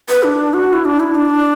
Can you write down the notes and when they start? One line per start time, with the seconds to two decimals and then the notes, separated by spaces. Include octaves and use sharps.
0.09 B4
0.23 D4
0.54 F#4
0.73 E4
0.85 D4
1.00 E4
1.15 D4